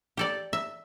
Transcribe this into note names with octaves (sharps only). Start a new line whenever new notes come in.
G4 A4 D5
E5